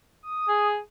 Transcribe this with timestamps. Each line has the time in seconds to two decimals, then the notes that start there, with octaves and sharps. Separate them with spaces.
0.23 D#6
0.48 G#4